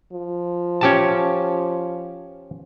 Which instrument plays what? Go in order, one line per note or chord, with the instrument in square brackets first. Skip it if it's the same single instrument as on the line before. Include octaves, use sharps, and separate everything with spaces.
[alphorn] F3
[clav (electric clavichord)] C#4 G4 A5